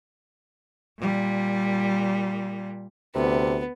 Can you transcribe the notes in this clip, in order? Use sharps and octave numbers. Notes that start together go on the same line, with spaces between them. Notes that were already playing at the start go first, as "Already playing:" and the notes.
A#2 G3
D2 C3 B3